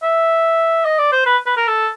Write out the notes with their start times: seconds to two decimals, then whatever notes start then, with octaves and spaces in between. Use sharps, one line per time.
0.03 E5
0.85 D#5
0.99 D5
1.12 C5
1.26 B4
1.46 B4
1.57 A#4
1.68 A4